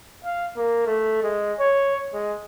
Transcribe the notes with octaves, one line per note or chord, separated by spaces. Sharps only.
F5
A#3
A3
G#3
C#5
G#3